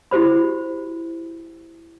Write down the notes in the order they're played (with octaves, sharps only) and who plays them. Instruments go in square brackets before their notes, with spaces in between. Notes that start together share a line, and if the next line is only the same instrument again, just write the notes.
[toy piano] E4 F#4 G4 C5 B5